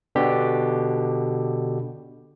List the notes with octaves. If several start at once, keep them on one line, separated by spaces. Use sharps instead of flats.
B2 D3 G4